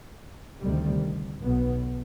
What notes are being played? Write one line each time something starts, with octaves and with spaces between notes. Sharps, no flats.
D2 C3 D#3 G3
B1 B2 B3